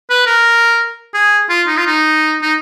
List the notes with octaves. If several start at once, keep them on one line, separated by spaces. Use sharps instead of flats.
B4
A#4
G#4
F4
D#4
F4
D#4
D#4